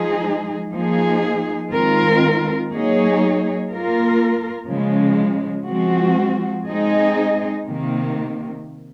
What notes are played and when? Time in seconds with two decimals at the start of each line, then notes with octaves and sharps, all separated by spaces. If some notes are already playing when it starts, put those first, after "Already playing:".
Already playing: F3 G#3 D#4 G#4
0.73 F3 A#3 D#4 G#4
1.71 D#3 G#3 C4 F4 A#4
2.71 F#3 A#3 D#4 G#4 C#5
3.71 A#3 F4 A#4
4.69 C#3 F3 G#3
5.68 F3 G#3 C4 F#4
6.67 G#3 C4 D#4 G#4 D#5
7.66 C3 D#3 A#3